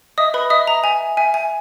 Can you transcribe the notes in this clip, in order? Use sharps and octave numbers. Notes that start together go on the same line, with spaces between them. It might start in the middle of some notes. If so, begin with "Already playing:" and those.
D#5 E5 D#6
B4 B5
D#5 E5 D#6
A#5
E5 G#5
E5 G#5
G#5